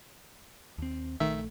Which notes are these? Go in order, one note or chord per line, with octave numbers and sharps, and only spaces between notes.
D#2 C4
A#1 D#3 A3 E5